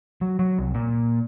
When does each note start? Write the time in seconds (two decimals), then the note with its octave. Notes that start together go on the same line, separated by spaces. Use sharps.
0.21 F#3
0.39 F#3
0.59 C2
0.74 A#2